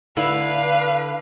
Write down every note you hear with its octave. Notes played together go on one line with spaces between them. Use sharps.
D3 E4 B4 F5